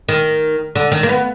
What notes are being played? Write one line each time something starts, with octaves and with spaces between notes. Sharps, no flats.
D#3
D3
D#3
A#3
B3